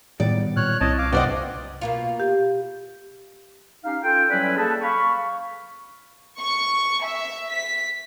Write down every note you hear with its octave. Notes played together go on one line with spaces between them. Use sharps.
A2 D#3 G3 B3 D5
A#2 C#5 F6 F#6
C2 C4 E4 C#5 D#5 A5
F5 D6
C3 B4 C5 D5 D#5 F#5 G5 D6
B2 A#3 F4
G4
C#4 D#4 G4 F5
C#4 F4 A4 G5
F#3 G3 C#4 E4 B4 D5
A#3 G#4 A4 B4 A5
F5 B5 C#6
C#6
E5
B6